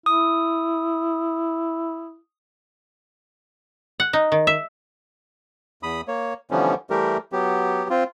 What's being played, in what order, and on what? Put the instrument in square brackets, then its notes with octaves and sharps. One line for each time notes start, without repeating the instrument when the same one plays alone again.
[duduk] E4 [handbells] D#6
[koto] F#5
D#4
D#3
E5
[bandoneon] E2 B5 D#6
A#3 C#5
D3 E3 F3 G3 B3 C#4
E3 G3 A3 G4 A#4
F#3 B3 G4
C4 F4